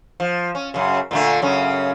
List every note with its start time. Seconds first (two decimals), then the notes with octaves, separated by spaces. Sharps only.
0.20 F3
0.55 C#4
0.74 F#2 C#3
1.11 A#2 D3 A3
1.42 F#2 C#3 C#4